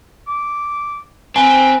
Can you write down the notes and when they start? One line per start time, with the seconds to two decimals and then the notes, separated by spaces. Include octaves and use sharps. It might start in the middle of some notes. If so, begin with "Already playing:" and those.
0.27 D6
1.36 C4 B4 G#5